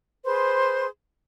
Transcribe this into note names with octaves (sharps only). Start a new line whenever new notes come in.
G#4 B4 C5 C6